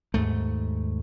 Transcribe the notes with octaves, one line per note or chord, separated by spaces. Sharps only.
D#2 G#2 A3